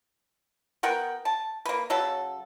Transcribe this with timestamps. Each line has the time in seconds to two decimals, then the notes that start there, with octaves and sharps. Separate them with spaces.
0.83 B3 A#4 F#5 G5
1.25 A5
1.65 A#3 B4
1.90 C#3 F#3 A4